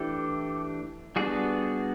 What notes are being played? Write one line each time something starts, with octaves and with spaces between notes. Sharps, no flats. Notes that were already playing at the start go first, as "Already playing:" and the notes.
Already playing: E3 A3 D4 G4 A4
G3 B3 D4 F#4 G#4